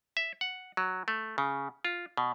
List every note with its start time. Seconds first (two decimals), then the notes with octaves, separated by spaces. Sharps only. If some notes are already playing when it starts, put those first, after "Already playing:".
0.17 E5
0.41 F#5
0.77 F#3
1.08 A3
1.38 C#3
1.85 F4
2.17 B2